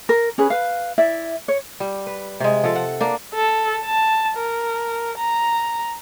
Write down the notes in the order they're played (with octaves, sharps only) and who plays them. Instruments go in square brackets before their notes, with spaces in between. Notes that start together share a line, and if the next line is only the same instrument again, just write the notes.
[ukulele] A#4
C#4 G#4 B4
B4 F5
E4 D5 E5
C#5
[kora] G3
B4
C3 G#3
F3 A4
F#5
A#3 D4
[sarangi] A4
A5
A#4
A#5